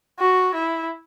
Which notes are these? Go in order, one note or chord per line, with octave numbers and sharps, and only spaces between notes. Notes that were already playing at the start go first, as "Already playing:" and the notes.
F#4
E4